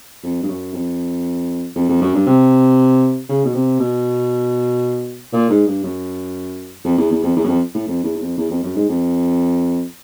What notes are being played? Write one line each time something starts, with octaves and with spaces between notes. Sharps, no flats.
F2
G2
F#2
F2
F2
F2
F#2
G2
C3
C#3
B2
C3
B2
A#2
G#2
G2
F#2
F2
E2
E2
F2
E2
F#2
F2
A2
F2
E2
E2
F2
E2
F2
F#2
G#2
F2